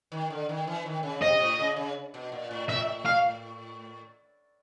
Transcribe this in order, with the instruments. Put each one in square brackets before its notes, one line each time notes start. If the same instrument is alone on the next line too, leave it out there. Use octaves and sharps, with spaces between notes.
[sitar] D#3
D3
D#3
E3
D#3
C#3
[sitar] C3 [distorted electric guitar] D#5
[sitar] A2
C#3
C#3
B2
A#2
A2
[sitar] A2 [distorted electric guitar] E5
[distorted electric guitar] F5